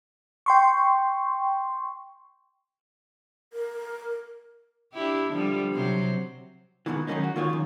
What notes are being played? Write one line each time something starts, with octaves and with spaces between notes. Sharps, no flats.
G5 C6 C#6
A#4
D4 E4 G4
D3 F3 G3
C3 F#3 C5
E2 G2 B2 D#3 E3
D#3 F#3 G#3 A#3 C#4 D#4
F#4
D#3 A#3 F4 C#5
F#2 D#3